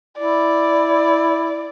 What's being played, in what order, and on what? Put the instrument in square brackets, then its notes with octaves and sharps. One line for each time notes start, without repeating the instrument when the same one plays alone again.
[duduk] E4 [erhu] D5